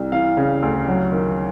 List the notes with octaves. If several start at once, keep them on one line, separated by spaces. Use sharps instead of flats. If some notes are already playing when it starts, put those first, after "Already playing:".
Already playing: C2
E3 F5
C#3
D2
F#3
D#3